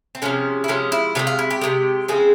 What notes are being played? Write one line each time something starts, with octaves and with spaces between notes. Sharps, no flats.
C4
C3 F3 G#3 C#4
E4
C3 F3 G#3 C#4
E4
C3 F3 G#3 G4
F4
E4
G4
C3 F3 G#3
C#3 F3 G#3 C4 G#4